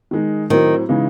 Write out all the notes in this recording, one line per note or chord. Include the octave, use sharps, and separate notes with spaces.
D#3 G#3 D#4
A2 D#3 F#3 C4
C#3 E3 G#3 D#4